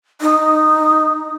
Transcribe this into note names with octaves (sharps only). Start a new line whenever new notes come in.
D#4